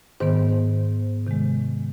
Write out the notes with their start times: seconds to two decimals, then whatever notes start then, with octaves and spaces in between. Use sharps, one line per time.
0.20 G#2 D#3 B3 C5
1.27 C3 D#3 G#3